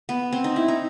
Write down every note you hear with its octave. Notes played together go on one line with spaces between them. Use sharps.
B3
C4
D#4
E4
D#4